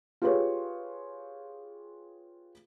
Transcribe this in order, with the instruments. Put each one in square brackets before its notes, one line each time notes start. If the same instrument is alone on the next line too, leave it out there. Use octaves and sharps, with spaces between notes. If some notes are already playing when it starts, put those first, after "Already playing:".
[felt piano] F4 G4 G#4 B4 C#5